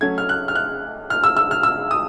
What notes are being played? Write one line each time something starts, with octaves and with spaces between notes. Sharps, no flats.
F#3 A3 C#4 G#6
F6
F#6
F6
F#6
F6
E6
E6
F6
E6
D#6